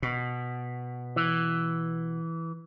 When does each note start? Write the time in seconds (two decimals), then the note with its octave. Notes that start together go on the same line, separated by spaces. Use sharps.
0.02 B2
1.16 E3